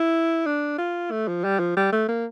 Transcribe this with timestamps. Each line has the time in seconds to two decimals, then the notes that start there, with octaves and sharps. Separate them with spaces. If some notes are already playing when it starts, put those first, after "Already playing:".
Already playing: E4
0.46 D4
0.78 F4
1.11 A3
1.28 F3
1.44 G3
1.59 F3
1.77 G3
1.92 A3
2.08 A#3